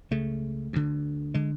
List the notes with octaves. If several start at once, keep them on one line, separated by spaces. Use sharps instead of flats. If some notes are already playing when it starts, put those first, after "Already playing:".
C#2 C#3 A3
D2 D3
D3 G#3